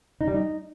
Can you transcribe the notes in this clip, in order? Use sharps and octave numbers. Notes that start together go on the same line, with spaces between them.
D#4
G3
D#4